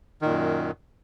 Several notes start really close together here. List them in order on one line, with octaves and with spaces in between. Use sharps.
D#3 A#2 F#2